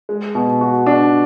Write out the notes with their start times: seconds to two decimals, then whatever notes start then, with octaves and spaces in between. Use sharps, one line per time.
0.09 G#3
0.35 B2
0.61 F#4
0.86 D4